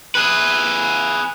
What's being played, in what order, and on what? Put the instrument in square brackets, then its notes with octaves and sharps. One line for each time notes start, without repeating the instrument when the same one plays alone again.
[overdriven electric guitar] G#4 B4